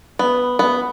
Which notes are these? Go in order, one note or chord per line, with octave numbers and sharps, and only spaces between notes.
B3
B3